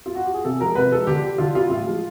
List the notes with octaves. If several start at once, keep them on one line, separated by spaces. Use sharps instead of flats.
F4
F#4
G4
G#4
C3 A4
F3 G#3 A#4
C3 B4
F3 G#3 A4
D3 G4
G3
D3 F4
G3 F4
A2 F4
F3 G#3